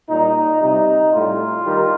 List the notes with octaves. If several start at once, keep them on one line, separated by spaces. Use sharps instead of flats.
A#2 G3 D#4
C3 G3 D#4
A2 G3 F4
D#3 G3